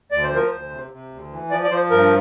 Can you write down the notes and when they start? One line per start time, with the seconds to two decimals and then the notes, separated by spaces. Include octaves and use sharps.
0.11 D2 D5
0.24 C5
0.32 F3 A#4
0.47 D2 C5
0.71 C3
0.91 C3
1.11 D2
1.31 E3
1.51 F3 D5
1.64 D5
1.71 F3 C5
1.90 G2 A#4